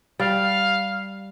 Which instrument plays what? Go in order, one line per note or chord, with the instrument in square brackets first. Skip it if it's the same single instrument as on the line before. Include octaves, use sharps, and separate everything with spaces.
[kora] G3 [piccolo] F5